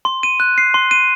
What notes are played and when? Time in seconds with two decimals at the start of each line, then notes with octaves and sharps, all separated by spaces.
0.05 C6
0.23 D#7
0.40 F#6
0.58 C7
0.74 C6
0.91 D#7